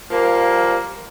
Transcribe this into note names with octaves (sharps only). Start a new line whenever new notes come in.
F3 G3 A#3